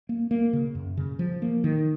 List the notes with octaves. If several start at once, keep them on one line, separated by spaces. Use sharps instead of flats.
A#3
A#3
C#3
F#2
C#3
F3
A#3
D#3